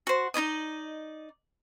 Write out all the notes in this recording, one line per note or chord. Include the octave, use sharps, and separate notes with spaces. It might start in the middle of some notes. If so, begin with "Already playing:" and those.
F#4 C5
D#4 E4 D5 D#5